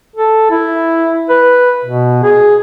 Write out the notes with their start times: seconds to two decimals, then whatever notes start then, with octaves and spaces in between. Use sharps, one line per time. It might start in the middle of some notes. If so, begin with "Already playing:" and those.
0.16 A4
0.51 E4
1.29 B4
1.85 B2
2.23 G#4